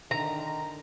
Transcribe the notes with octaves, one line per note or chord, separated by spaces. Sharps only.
D3 D#3 A#5